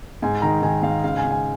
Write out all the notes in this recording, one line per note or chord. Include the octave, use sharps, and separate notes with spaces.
G#2 G#5
D#3 A#5
D#3 G#5
G#2 F5
C#3 F5
G#5
C#3
G#5